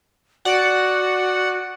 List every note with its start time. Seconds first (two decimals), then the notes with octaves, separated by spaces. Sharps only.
0.45 F#4 D5 F#5